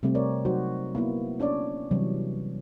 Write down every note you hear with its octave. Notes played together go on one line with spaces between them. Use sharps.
C3 G3 A3 C4
A#4 C#5 D5
F#3 D#4 F#4 C5
A#3 B3 E4
C#4 D4 C#5 D5
C3 E3 F#3 G3 C#5